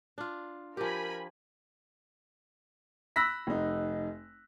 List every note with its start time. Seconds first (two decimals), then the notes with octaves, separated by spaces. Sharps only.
0.18 D4 F4
0.77 F3 G4 A#4 G#5 B5
3.16 B5 E6 F#6 A#6 B6
3.47 F1 D#4